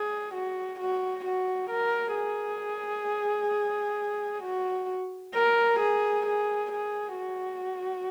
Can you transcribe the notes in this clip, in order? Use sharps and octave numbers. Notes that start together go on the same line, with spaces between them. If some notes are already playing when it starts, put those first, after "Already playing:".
Already playing: G#4
F#4
F#4
F#4
A#4
G#4
F#4
A#4
G#4
G#4
G#4
F#4